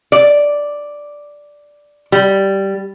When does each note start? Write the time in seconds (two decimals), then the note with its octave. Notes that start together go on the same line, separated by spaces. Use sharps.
0.12 D5
2.12 G3